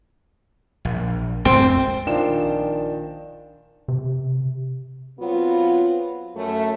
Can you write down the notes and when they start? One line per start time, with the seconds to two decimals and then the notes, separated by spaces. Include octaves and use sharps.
0.85 A#1
1.45 F2 G#2 A3 C4
2.07 A#1 D#3 D4 F4 G5 E7
3.88 C3
5.20 F#3 B3 C4 F4
6.35 F#2 A3